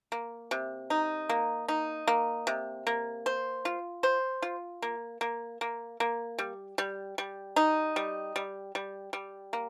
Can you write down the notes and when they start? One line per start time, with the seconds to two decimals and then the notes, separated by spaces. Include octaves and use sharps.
0.12 A#3
0.51 C3
0.90 D#4
1.29 A#3
1.68 D#4
2.07 A#3
2.47 C3
2.87 A#3
3.26 C5
3.65 F4
4.03 C5
4.42 F4
4.82 A#3
5.21 A#3
5.61 A#3
6.00 A#3
6.38 G3
6.78 G3
7.18 G3
7.56 D#4
7.96 G3
8.36 G3
8.75 G3
9.13 G3
9.53 A#3